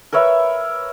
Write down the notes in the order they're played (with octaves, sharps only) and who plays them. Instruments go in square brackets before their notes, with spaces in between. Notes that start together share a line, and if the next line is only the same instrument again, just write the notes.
[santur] A#4 B4 C#5 E5